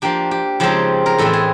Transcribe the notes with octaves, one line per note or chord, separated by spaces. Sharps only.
F3 A#3 D4 G4
G4
C#3 F3 G#3 C4 D#4 G4
A#4
A2 E3 G#3 C4 A4
G#4